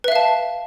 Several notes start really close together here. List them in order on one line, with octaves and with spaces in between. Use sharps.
B4 E5 F5 A5